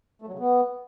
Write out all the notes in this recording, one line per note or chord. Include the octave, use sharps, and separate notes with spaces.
A3
F#3
C#3
B3